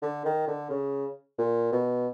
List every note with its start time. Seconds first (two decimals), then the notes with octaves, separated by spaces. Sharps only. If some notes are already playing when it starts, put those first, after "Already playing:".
0.02 D3
0.25 D#3
0.47 D3
0.70 C#3
1.38 A#2
1.72 B2